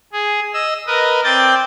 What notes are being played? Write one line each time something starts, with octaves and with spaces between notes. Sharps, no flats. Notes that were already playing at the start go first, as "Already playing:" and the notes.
G#4
D#5 E6
A#4 B4 D#5
C4 D5 G6 A6